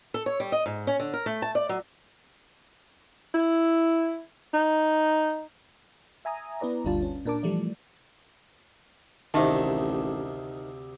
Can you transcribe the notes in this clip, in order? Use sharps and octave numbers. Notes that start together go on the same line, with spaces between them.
A4
C#5
G3
D#5
G#2
C#4
D3
A#4
A3
A5
D5
F#3
E4
D#4
E5 G#5 A#5 D#6
B3 E4 B4 D5 A#5
G1 D2 G3 D4 F4 A5
C#4
A#2 D4 A#4 A5 D6
E3 F3 G3 A3 D5
A1 D2 C3 D#3 C5 E5 A5